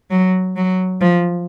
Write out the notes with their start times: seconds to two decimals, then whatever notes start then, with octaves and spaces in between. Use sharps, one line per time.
0.11 F#3
0.56 F#3
1.01 F3